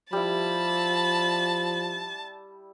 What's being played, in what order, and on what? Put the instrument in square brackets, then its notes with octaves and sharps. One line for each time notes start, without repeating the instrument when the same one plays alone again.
[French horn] F3 [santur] G3 E4 [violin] A5 [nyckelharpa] B5